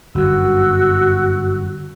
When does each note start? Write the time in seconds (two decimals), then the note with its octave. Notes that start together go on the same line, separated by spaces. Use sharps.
0.15 G1 F#2 F#4 E6